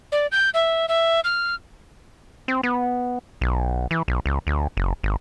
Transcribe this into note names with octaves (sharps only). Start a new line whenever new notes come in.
D5
G6
E5
E5
F6
C4
B3
B1
E3
B1
C#2
D2
F#1
G#1